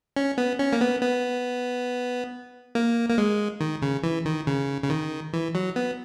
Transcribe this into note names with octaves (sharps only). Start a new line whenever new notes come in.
C#4
B3
C#4
A#3
B3
B3
A#3
A#3
G#3
D#3
C#3
E3
D#3
C#3
C#3
D#3
E3
F#3
B3